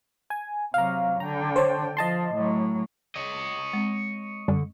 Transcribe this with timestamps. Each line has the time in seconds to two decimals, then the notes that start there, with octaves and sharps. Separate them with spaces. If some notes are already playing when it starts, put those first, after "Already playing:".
0.30 G#5
0.74 C3 F#3 F5 A#5
1.20 D3 G5 A#5
1.56 C5 C#5 A5
1.97 F3 D#5 A5 C6
2.35 A2 F#3
3.16 C#5 D#5
3.73 G#3 C4
4.48 F#2 D3 G3 C#4